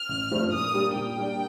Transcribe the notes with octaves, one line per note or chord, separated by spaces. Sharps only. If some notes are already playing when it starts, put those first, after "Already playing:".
Already playing: F6
A1
G2 F3 A3 C4
A#2 D#6
G3 A#3 D4 G4
A#2 G5
G3 A#3 D4 G4